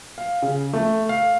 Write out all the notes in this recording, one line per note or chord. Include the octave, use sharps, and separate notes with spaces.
F5
C#3
A3
F5